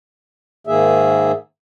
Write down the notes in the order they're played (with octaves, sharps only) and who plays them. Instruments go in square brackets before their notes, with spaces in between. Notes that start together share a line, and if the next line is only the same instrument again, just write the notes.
[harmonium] G#2 D#3 A#3 G#4 E5